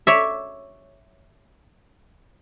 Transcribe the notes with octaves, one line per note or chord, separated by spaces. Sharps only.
C#5 D5 E5